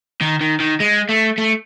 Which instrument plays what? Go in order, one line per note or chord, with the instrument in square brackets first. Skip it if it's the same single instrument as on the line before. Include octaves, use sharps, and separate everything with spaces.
[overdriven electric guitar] D#3
D#3
D#3
G#3
A3
A3